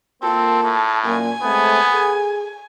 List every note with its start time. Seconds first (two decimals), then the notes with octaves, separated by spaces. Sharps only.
0.23 A#3 C4 F4 A4
0.64 A2
1.05 F#2 A#2 G#5
1.43 G#3 A3 B3 C4
1.92 G#4 A4